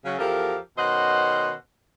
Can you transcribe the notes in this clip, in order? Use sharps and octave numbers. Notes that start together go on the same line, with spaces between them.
C#3 F#3
E2 F3 G4 A4 A#4
B2 D#3 C#4 C5 D#5 F#5